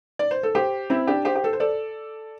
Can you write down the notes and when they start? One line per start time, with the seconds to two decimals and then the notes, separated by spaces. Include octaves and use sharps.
0.19 D5
0.31 C5
0.43 A4
0.55 G4 C5
0.90 C4 E4
1.07 D4 G4
1.25 G4 C5
1.35 G4
1.44 A4
1.53 C5
1.60 A4 D5